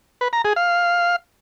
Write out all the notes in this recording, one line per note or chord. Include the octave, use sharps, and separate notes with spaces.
B4
A#5
G#4
F5